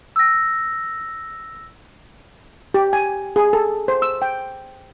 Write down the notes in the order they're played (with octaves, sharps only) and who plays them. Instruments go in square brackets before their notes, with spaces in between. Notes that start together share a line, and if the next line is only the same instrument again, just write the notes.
[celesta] E6 A#6
[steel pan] G4
G#5
G#4
A4
C5
E6
G5